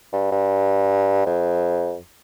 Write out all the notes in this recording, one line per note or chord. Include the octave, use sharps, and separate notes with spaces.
G2
G2
F2